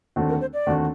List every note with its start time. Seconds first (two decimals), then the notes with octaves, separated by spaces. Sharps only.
0.16 D#2 D3 A3 C4 F#4
0.29 A#4
0.41 C5
0.54 D5
0.66 D#2 D3 A3 C4 F#4